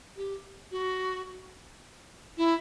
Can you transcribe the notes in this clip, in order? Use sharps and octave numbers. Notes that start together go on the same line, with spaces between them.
G4
F#4
E4